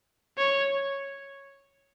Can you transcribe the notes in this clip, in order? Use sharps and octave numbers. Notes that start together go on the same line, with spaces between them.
C#5